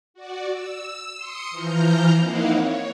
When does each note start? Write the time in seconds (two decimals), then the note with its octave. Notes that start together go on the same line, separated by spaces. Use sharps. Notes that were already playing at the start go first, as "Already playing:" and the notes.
0.14 F#4 D5
0.49 E6
1.16 C6 D#6 C#7
1.51 E3 F3 A#5 F6 G6
2.19 A#3 C4 D#4 E4 F5 F#5
2.51 C#5